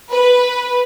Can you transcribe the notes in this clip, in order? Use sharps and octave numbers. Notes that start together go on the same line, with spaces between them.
B4